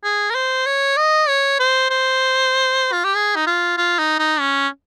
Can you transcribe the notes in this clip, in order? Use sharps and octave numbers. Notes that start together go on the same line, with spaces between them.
G#4
A#4
C5
C#5
D#5
C#5
C5
C5
F4
G4
G#4
D#4
F4
F4
D#4
D#4
C#4